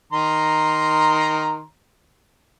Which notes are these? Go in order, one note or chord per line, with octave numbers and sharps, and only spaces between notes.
D#3 A#5 C6